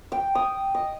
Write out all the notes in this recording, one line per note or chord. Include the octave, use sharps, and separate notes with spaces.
G5
D#6
D#5